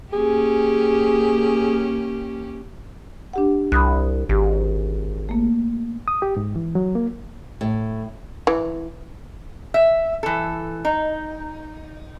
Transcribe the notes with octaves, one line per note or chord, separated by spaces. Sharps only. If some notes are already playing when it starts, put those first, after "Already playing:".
A#3 C#4 G4 G#4
D4 G4 F#5
C2 B5 D#6 F#6
G#1 G4
A3 A#3
D#6
G4
G#2
E3
F#3
A#3
A2
E3
E5
E3 A4
D#4